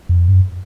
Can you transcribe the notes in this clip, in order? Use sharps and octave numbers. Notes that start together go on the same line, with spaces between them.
F2
G2
F#2